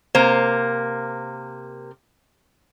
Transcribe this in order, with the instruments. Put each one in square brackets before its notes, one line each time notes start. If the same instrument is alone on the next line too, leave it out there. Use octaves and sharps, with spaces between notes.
[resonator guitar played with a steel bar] C3 A#3 [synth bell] C5